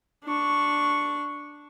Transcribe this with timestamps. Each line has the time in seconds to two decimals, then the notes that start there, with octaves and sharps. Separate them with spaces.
0.25 D4 C#6